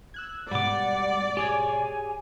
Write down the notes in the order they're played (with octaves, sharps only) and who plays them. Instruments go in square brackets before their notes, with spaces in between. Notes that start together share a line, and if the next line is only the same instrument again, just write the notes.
[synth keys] E6 F#6 G#6
[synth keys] G#2 B2 [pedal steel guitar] G3 D6 [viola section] D5 [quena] F#5
[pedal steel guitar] G4 G#4 C#5 [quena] G#5